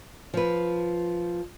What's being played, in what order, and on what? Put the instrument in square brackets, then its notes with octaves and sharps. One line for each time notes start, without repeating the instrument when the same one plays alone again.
[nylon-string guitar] F3 B4